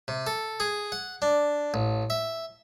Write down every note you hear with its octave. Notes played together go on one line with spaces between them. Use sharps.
C3
A4
G#4
F#5
D4
A1
E5